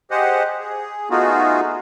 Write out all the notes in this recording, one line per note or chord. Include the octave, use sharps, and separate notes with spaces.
G4 G#4 C5 D#5 F#5
G#4
A3 B3 D#4 F4 F#4 G#4